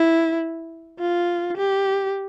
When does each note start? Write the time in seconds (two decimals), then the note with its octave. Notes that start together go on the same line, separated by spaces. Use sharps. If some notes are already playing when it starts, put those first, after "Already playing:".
Already playing: E4
0.99 F4
1.58 G4